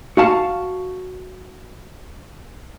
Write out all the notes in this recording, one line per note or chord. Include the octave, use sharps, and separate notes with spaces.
F#4 F5 A5